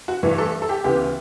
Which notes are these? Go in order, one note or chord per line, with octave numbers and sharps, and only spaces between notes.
F#4
G2 E3 A3
A4
A4
G4
D2 C#3 E3 B3 G4